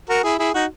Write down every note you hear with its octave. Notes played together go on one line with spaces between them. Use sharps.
F#4 A#4
E4 G#4
E4 G#4
D#4 F#4